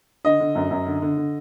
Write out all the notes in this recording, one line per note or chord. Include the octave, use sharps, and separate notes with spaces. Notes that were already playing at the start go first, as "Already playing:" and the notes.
D3 D#5
D3
F#2
F#2
D3
D3
D3